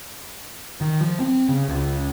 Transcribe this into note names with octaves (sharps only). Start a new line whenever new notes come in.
D#3
F3
C4
C#3
C#2